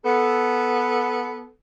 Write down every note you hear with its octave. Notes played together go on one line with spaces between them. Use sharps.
B3 A4